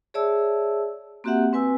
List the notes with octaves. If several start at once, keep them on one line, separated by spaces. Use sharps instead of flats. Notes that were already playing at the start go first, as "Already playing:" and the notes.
G#4 C#5 D5 E5 A5 E6
A#3 C4 F#4 G4 E5 F#5
C4 B4 G#5 E6